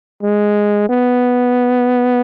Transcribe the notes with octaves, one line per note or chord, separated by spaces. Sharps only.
G#3
B3